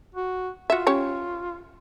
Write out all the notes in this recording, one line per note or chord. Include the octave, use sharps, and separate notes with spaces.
F#4
F4 F#4 E5
C#4 G4 C#5